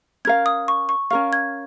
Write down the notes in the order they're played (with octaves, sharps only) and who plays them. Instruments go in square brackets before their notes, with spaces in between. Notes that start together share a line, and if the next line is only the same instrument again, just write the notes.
[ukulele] C#4 A#4 F5 [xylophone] G#6
[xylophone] D#6
C#6
C#6
[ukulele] C#4 A#4 F5 [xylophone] C#6
[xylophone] G#6